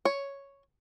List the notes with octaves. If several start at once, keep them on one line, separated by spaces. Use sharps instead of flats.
C#5